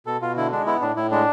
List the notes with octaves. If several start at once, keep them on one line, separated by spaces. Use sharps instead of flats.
B2 A4
B2 F4
D3 E4
G#3 D4
B3 E4
A2 D4
A2 E4
G#3 D4